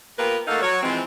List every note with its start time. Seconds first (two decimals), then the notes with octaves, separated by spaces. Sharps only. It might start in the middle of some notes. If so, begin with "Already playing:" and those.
0.18 A#3 B3 F4 G4 A#4 B4
0.47 A3 A#3 D#4 F#4 A4 F5
0.62 F#3 C#5
0.83 E3 F3 G#3 C4